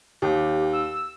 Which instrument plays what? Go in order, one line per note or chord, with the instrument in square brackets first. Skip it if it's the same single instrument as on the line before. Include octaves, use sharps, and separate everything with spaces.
[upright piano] D#2 [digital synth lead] G4
[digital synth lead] E6